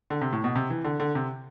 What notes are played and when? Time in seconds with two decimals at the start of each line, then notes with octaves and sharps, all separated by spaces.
0.10 D3
0.21 C3
0.33 A2
0.44 B2
0.55 C3
0.70 E3
0.84 D3
1.00 D3
1.15 C3